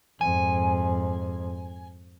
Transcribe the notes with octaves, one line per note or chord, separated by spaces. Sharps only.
F2 G#2 G#5